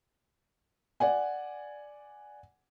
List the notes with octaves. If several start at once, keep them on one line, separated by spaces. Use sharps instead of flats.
D5 F#5 G#5